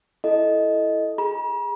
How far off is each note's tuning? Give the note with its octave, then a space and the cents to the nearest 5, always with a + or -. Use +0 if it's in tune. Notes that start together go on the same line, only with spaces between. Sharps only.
E4 +0 A4 -5 D#5 +0
G#4 -15 A#5 +45